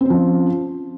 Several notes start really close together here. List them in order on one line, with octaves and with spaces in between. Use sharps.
C4 C#4 F3